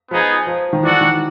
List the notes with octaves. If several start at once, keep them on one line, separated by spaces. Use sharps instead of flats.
F3 B3 D#4 G#4
F3
D#3
E3 F#4 A4 D5 F#5
D#3